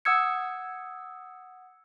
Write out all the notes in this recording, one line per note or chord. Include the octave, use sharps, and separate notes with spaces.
F#5 D#6 E6 G#6 C#7